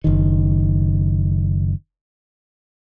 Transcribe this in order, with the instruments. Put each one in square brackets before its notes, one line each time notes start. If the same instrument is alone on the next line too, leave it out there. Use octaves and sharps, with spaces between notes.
[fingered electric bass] F#1 D#3